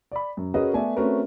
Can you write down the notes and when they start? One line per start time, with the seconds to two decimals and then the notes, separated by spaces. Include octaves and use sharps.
0.12 D5 B5
0.37 F#2
0.54 C#4 F#4 G#4 A#4 B4 D#5
0.74 A3 B3 A4 D5 E5 G#5
0.96 A3 C4 C#4 F#4 A#4 B4